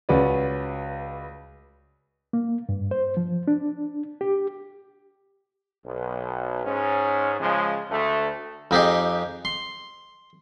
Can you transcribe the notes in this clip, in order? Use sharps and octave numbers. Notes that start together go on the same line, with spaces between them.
C#2 C#4 F#4 B4 D5
A#3
G2
C5
F3
D4
G4
B1
G#2 C#4
C#3 F3 G#3
D2 A3
F2 D#4 G4 G#4
C6